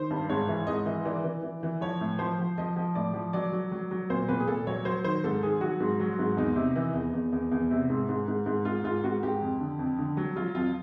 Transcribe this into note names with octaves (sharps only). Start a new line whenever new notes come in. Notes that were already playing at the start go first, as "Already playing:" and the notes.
Already playing: D#3 C5
G2
G#2 C#5
E3
G#2 D#5
E3
E3 D5
E3
E3
E3
F3 C#5
A2
F3 C5
F3
F3 D#5
F3
A2 D5
F3
F#3 D5
F#3
F#3
F#3
A#2 C5
A#2 B4
G#4
A#2 A4
F#3 C#5
F#3 C5
D#3 C5
G#2 A4
D#3 G#4
F#3 F#4
G#2
F#3
G#2
E2 D#4
C3
E3
E2
E2
E2
E2
C3
G#2
G#2
G#2
G#2
G#2 F4
G#2 F4
G#2 F#4
G#2 G4
F2
D3
F2
D3
F#3
F#3 F4
F2 F4